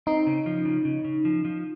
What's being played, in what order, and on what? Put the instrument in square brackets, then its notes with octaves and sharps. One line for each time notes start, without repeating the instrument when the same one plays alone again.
[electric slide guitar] C4 [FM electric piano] D#4
[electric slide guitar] C#3
F3
C#3
C#3
C#3
F3
F3